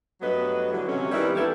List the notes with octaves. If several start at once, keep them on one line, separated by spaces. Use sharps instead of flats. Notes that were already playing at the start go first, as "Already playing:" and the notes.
G2 F#3 A3 B3 B4 D#5
D3 E3 F#3
C3 F#3 C#4
D#3 E3 G3 B3 E4
A#3 D4 E4 G4 A4 B4